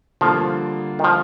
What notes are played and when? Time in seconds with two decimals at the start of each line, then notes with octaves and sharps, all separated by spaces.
0.21 D3 F3 G3 A#3 F4
0.99 D#3
1.04 F3